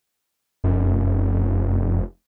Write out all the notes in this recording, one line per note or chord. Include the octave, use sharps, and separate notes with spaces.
F1 F#2